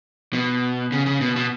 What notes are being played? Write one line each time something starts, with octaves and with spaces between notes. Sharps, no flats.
B2
C#3
C#3
B2
B2